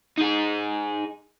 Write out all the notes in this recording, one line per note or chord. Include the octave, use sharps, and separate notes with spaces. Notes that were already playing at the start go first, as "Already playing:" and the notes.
D#4 G#4